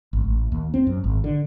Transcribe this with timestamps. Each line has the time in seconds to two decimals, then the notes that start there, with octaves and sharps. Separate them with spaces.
0.13 G#1
0.25 A1
0.52 D#2
0.74 C4
0.87 F#2
1.04 G#1
1.24 D3